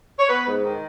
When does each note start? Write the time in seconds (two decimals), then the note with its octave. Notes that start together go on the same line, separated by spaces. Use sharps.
0.19 C#5
0.29 B3 B4
0.47 G#2
0.64 D#3